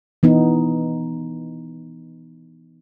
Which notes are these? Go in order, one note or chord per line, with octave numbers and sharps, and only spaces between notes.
E3 B3 D#4